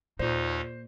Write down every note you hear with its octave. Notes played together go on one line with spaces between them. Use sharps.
D#2 A#2 D#4 F4 C5 D5